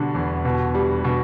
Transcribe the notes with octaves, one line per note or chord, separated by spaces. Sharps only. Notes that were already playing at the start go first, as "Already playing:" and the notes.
Already playing: B2 D3 G3
E2
B2
G3
B2